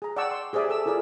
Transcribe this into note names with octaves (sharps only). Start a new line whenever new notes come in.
G#4 A#5
D5 F#5 G5 A5 C#6 E6
C6
G4 G#4 C5 D5 E5 G#5
A4 E6
E4 F4 G#4 A#4 D5 G#5